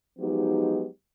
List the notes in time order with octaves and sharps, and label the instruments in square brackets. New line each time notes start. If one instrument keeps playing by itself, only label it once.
[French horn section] F3 F#3 G#3 B3 D#4 G4